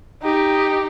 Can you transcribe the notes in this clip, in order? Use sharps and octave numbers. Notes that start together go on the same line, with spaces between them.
D#4 G4